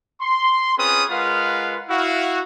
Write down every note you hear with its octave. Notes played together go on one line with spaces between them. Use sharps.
C6
C4 C#4 F4 G#4 B4 D#6
G#3 F4 A#4 B4 F5 F#5
E4 F#4 F5